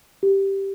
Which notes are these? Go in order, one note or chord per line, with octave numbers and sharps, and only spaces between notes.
G4